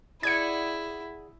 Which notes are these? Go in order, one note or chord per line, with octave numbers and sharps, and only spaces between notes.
E4 G#4 D5 F#5 G#6 C#7